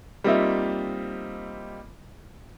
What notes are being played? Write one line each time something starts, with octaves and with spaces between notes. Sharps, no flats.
G3 A#3 C4 D#4 F4 E5